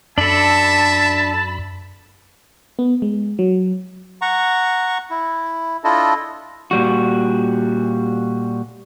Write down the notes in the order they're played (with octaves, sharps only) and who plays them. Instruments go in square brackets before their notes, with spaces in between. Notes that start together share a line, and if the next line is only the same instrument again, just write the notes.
[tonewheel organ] F#2 B5 [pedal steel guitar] D4 A4 [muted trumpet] E5 [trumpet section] A5
[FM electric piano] B3
G#3
F#3
[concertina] F#5 A#5 C#6
E4
D4 E4 F4 A4 D#5
[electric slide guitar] A#2 G3 F#4